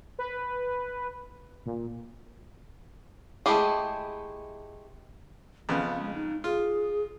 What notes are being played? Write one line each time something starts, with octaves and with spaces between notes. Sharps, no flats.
B4
A#2
G#3 A3 E4 G4 G#4
F2 C#3 B3 C#4
G#3
D#4
F4 G#4